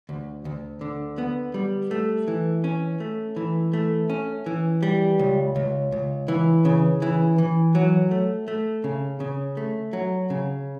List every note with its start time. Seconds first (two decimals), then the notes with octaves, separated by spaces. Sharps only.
0.09 D2
0.45 D2
0.81 D3
1.18 B3
1.54 G3
1.91 A3
2.28 E3
2.64 C#4
3.00 A3
3.36 E3
3.73 A3
4.10 C#4
4.46 E3
4.83 G3
5.19 C#2
5.56 C#2
5.92 C#2
6.28 E3
6.65 C#3
7.02 E3
7.38 E3
7.75 F#3
8.11 A3
8.48 A3
8.84 C#3
9.20 C#3
9.57 A3
9.93 F#3
10.30 C#3